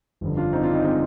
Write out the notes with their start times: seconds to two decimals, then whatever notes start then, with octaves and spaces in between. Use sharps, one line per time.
0.21 G1 F2 D3
0.37 D4 F4
0.52 C4 D#4
0.63 D4 F4
0.73 C4 D#4
0.83 G#3 C4